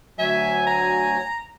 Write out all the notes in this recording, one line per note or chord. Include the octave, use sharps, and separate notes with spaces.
D2 F#3 E5 G#5
A#5